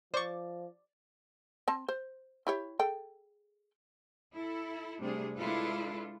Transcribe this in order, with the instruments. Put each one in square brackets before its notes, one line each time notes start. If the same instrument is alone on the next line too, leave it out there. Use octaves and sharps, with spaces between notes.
[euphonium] F3 [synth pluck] C5 C#6 [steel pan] D5
[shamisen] C4 A5
C5
E4 G4 C#5
G#4 A4 G5
[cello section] E4 A4
C3 G3 A3 D4 G#4
G#3 D4 E4 F4 A4 B4